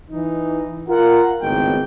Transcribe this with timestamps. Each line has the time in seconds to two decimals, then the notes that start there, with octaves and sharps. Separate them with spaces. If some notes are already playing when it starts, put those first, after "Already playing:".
0.11 E3 D#4
0.89 F4 A#4 F#5
1.42 G#1 C#2 A2 B3 D#4 G5